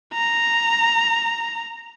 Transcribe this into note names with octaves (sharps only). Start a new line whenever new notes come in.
A#5